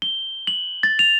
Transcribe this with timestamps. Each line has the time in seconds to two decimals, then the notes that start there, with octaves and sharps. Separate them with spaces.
0.02 G7
0.47 F#7
0.83 A6
0.99 F7